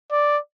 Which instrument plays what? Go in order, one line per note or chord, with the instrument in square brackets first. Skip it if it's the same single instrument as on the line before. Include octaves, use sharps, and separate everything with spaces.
[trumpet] D5